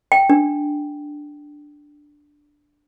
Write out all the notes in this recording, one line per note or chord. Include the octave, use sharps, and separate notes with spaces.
G5
D4